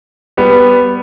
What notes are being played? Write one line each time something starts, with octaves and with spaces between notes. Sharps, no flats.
G3 B3